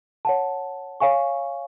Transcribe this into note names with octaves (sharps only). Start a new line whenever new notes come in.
C#5 F#5 A5
C#5 F5 G#5 C#6